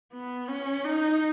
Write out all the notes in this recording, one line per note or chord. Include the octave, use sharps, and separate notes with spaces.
B3
C#4
D#4